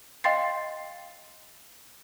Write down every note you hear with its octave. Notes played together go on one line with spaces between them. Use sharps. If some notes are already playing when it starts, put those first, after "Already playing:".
D#5 F5 G5 C6 A6 C7